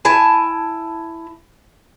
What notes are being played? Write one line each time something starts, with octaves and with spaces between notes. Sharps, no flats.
E4 G#5 A5